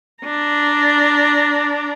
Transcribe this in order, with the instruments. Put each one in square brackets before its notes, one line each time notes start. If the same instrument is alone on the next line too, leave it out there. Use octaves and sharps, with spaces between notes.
[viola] D4 A#5